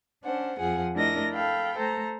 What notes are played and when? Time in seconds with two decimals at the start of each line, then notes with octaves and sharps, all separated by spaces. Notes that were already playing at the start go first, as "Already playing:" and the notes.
0.24 C#4 D4 C5 F#5
0.58 F2 F3 G#4 F#5
0.95 A3 D4 E4 A#4 D#5 A#6
1.33 A4 F5 G5 B5
1.77 A3 A4 C5 A#5